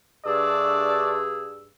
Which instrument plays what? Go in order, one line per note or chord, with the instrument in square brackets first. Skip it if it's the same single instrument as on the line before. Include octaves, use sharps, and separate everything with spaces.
[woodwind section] G2 G#4 E6 [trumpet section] A3 D4 D5